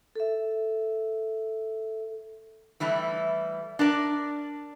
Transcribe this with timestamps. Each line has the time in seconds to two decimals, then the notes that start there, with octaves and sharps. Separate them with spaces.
0.15 A4 E5
2.80 E3 G3 A3 E4
3.79 D4 A#4 D5